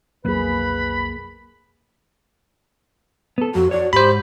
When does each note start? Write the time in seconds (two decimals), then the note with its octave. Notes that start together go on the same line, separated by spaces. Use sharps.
0.25 B1 F2 F#3 A#3 G#4 B4 B5
3.38 B3 A4
3.55 F2 F#4
3.71 F#4 C#5 D5
3.93 G#2 G4 C5 B5